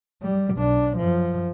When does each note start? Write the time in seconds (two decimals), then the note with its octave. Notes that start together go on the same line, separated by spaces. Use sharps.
0.22 G3
0.54 B1 D4
0.97 F#2 F3